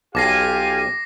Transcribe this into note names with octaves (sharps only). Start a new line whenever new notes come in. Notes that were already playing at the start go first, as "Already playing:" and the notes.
B1 F4 G4 F5 G#5 D6 A#6 C7